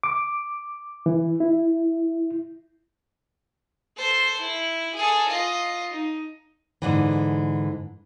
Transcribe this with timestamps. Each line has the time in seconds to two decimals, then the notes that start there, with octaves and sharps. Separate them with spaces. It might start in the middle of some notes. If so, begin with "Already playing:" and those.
0.04 D6
1.06 E3
1.40 E4
3.96 A4 C5
4.40 E4
4.95 G#4 A4
5.28 F4 D#5
5.93 D#4
6.82 G#2 D3 E3